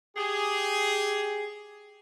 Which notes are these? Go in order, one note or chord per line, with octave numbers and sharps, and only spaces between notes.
G4 G#4